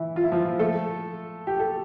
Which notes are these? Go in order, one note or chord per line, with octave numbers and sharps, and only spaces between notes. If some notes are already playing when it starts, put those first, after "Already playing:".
Already playing: E3 E4
F4
E4
F3 F4
A3 A4
G4
A4